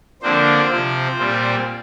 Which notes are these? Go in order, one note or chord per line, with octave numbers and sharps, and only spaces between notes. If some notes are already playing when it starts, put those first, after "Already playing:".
D3 F3 A#3 C4 D4 C5
C3 F3 C4
A#2 G3 C4